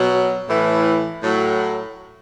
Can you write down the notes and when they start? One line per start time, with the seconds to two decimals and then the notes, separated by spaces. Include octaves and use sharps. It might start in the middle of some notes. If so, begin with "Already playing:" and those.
Already playing: B2 F#3
0.49 A2 E3
1.23 A2 F#3